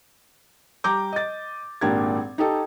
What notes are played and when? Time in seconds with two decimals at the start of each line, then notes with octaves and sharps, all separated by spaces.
0.84 G3 A#5 D6 G6
1.13 D#5 A6
1.81 G#1 A#2 D4 G4 A#4 G#6
2.38 D#4 G4 A4